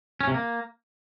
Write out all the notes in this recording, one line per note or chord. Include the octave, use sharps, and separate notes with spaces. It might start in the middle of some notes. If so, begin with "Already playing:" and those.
C#4
C3
A#3